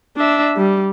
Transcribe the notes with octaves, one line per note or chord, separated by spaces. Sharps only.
D4 E5
G3